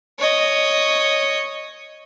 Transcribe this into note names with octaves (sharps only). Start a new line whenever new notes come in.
C#5 D#5